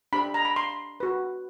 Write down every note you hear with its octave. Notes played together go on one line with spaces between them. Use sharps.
D4 G4 C5 B5
A#5
B5
C6
F#4 B4